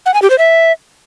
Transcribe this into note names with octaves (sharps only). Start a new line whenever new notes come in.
F#5
G#5
G4
C5
E5